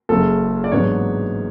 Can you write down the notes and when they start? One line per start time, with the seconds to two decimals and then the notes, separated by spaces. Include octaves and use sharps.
0.09 F#1 F#2 C#3 A4
0.64 D5
0.71 A1 G#2 F#3 B3 D4 C#5